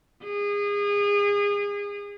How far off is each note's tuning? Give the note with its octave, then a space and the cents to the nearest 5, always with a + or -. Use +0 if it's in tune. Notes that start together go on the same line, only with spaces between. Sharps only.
G#4 -30